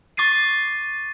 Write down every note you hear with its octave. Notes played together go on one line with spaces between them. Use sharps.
C#6 D6 A6 C7 D#7